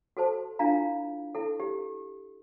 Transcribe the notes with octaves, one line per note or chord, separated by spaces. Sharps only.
F#4 A4 C5 A5
D4 E4 F4 F5 A#5
E4 A4
G4